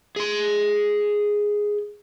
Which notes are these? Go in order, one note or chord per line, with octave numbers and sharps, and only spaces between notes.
G#4 C6